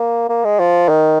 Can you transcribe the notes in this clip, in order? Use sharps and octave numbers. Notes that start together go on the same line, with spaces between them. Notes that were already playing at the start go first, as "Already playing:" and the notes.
Already playing: A#3
A#3
G#3
F3
D#3